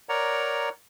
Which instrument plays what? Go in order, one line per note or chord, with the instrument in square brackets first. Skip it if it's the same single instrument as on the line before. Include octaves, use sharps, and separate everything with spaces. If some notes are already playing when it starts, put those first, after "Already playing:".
[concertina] A#4 C#5 D5 F#5 A#5